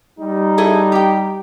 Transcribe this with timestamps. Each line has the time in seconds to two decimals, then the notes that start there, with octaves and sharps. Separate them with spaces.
0.19 G3 D#4
0.58 E4 G#4 A4
0.92 G4 G5